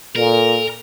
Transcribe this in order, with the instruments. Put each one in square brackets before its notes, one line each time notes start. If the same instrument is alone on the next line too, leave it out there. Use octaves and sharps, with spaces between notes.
[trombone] A#2 [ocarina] A4 [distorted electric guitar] A#4